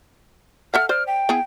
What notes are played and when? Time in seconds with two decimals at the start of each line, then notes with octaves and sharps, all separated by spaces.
0.74 A4 E5 F#5 F6
0.89 C5 D5 F6
1.07 G5
1.29 B3 E4 G#4